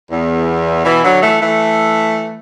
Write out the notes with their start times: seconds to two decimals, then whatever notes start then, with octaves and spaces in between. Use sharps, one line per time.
0.11 E2
0.85 B2 E3
1.03 D3 F#3
1.22 E3 A3
1.41 E3 A3